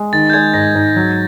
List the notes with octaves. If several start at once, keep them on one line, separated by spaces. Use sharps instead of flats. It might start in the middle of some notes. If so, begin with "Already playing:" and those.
Already playing: G#3
D#3 A6
G6
G#3 G#6
G#2 A#6
G#2
F#3